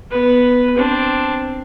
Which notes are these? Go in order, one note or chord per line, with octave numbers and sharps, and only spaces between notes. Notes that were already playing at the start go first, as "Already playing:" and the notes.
B3 B4
C4 D4